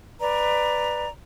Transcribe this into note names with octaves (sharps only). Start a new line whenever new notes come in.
B4 D5 A#5